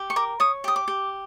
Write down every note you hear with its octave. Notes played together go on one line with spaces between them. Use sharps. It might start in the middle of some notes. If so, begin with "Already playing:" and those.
Already playing: G4
C#6
A#4 D6
C#5 D#6
G4 D#6
D6
G4